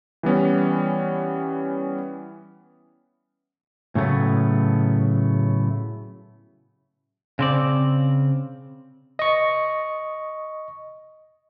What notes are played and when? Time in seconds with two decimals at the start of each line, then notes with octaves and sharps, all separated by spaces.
0.23 E3 G3 B3 C#4
3.95 A2 C#3 F#3 A3 B3
7.39 C#3 C4 D5
9.19 D#5 C#6